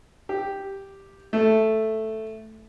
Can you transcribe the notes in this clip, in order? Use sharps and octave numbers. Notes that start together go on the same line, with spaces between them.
G4
A3